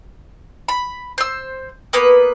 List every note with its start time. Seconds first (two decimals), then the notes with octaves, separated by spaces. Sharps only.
0.68 B5
1.18 C5 E6
1.93 A#3 B3 B4